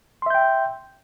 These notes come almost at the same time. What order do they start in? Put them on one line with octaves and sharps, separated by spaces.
C6 E5 G6 G5